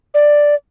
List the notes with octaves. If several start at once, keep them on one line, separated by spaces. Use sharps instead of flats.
D5